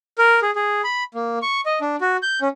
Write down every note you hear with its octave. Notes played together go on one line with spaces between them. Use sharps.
A#4
G#4
G#4
B5
A#3
C#6
D#5
D4
F#4
G6
C#4